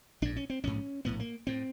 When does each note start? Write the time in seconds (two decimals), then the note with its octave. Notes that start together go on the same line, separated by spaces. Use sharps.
0.22 A#1 G#2 D4
0.36 C#4
0.50 C4
0.64 A#1 G#2 C#4
1.05 A#1 A2 B3
1.20 A#3
1.47 A2 C4